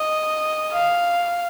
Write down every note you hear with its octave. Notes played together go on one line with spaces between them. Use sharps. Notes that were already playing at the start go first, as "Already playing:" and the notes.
Already playing: D#5
F5